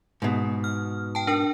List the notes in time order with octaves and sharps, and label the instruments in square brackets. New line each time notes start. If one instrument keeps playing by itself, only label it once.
[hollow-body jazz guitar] G#2 B2
[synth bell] F6
G5 A5
D4 A#4 G5